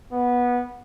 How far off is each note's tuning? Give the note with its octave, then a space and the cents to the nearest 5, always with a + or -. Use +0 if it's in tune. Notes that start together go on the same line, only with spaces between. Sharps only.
B3 -15